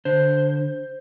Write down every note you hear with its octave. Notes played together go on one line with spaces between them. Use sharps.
D3 C5